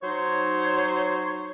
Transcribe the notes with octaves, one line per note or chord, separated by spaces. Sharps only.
F#3 D#4 C5 C#5